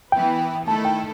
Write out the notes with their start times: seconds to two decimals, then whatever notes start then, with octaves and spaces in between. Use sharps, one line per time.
0.12 E3 B3 E4 B4 G5
0.67 D#3 A3 E4 A4 A5
0.85 G5